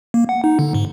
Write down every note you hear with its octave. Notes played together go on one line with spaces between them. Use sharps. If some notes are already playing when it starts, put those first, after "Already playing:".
A#3
F#5
D#4
D3
G#2